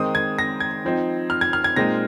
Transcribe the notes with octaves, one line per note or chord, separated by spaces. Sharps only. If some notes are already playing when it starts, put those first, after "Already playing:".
Already playing: D#3 G#3 C4 D#4 D#6
G#6
A#6
G#6
F3 C4 D#4
F6
G#6
F6
G#6
A#2 G#3 C4 D#4 A#6